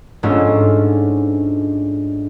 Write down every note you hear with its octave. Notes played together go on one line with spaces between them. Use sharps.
G#2 A3 C#4 D4 F4